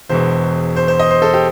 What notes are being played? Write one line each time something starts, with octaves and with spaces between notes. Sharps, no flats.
E1 E2 B2 C5
C5
C5
D#5
C5
A4
G4